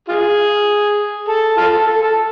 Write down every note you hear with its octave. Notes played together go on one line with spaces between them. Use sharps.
F4 G#4
A4
F4 A4
A4
A4